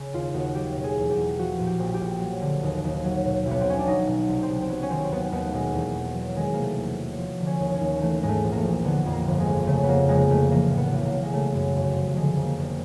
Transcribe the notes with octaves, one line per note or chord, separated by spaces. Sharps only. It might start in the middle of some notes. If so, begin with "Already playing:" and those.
Already playing: C#3
D#2 F4
D#2 F#4
F#3 G4
B2
G#4
E2
G4
E2
F3 F#4
A#2
G4
A#1
G4
A#1
F#3
D3
D#2
D#2
F#3
B2
B1
B3
C4
B1 C#4
D4
F#3 D#4
B2
C2
C4
C2
C4
F#3 B3
C#4
D#3 C4
C4
D#2 B3
D#2 B3
A3
B2 G#3
E2
E1
F#3
D#3 G#3
C3 A#3
A3
E2
F#3
F3
D3
C#4
D#2
C#4
D#2
E3 A3
G#2 G#3
A3
A#1
A#3
A3
A#1
D3 B3
F2
A#3
G1
G#3
G1
C#3 A3
F2 A#3 B3
F1 G#3
F1 A3
E3 A#3
A2
B3
B1
B3
A#3
B1
G#3
C#3 A3
F#2
G1
F3
D3 G#3
F2
A#3
F1